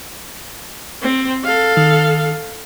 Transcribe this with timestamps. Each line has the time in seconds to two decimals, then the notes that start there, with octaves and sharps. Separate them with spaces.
1.03 C4
1.44 A4 F5
1.77 D#3